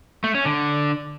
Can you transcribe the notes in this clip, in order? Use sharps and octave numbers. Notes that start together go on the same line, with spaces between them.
A3
C#4
D3